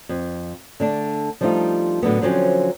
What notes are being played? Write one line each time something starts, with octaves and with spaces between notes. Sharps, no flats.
F2
D3 A3 D4
F3 G3 A3 D4 D#4 F4
A2 D3 F#3 B3
D3 F3 F#3 C4 C#4